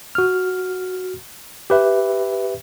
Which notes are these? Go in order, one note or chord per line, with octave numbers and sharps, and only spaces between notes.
F#4 F6
G4 B4 E5